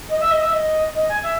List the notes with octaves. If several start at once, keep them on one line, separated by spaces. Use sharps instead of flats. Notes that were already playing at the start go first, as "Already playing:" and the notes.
D#5
E5
D#5
E5
D#5
D#5
G#5
E5